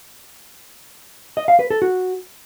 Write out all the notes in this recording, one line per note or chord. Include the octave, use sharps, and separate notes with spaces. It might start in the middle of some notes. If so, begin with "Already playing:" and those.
D#5
F5
B4
A4
F#4